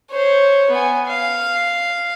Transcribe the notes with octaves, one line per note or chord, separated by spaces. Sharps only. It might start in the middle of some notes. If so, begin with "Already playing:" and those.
C5 C#5
B3 G#5
F5